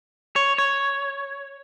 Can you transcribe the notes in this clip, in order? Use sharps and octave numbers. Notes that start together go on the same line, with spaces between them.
C#5
C#5